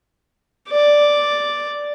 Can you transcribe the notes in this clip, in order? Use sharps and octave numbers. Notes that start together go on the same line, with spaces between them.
D5